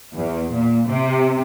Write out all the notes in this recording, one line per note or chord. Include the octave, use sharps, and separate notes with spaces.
E2
A#2
C3